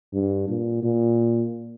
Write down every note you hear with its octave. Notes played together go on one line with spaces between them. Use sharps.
G2
A#2
A#2